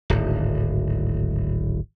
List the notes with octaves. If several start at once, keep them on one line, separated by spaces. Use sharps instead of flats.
D1 G#1